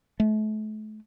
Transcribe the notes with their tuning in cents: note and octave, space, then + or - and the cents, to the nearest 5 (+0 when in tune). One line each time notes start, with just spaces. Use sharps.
A3 -40